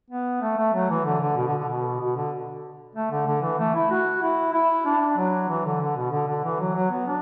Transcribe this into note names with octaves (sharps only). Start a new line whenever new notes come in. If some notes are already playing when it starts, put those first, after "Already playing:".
B3
A3
A3
F#3
E3
D3
D3
B2
D3
D3
B2
B2
D3
A3
D3
D3
E3
A3
E4
F#4
E4
E4
D4
F#3
E3
D3
D3
B2
D3
D3
E3
F#3
F#3
B3
D4